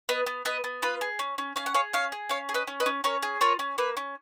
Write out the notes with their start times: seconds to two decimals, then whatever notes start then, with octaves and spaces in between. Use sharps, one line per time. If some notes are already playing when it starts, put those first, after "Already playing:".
0.09 B3 B4 D#5
0.26 B3
0.45 B3 B4 D#5
0.64 B3
0.82 F4 B4
1.01 G#4
1.19 C#4
1.38 C#4
1.56 C#4 F5
1.66 F#5
1.74 G#4 C#5 F5
1.93 C#4 C#5 F5
2.12 G#4
2.29 C#4 C#5 F5
2.49 G#4
2.54 B4 D#5
2.67 C#4
2.80 B4 D#5
2.86 C#4
3.04 C#4 A#4 C#5
3.23 G#4
3.41 F4 A#4 C#5
3.59 C#4
3.78 A#3 B4
3.97 C#4